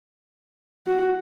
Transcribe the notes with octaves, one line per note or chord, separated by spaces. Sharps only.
F#4